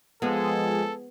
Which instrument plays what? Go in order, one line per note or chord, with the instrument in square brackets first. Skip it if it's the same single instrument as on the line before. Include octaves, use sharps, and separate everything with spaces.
[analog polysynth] F3 G#3 G#4 [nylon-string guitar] B3 [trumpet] A4